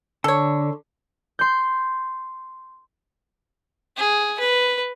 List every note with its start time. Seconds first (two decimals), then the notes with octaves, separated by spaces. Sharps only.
0.24 D3 A4 C#5
1.39 C6 G6
3.97 G#4
4.39 B4